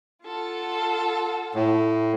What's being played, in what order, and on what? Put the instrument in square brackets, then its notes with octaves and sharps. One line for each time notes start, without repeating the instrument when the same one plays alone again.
[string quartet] F4 A4 F#5
[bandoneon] A2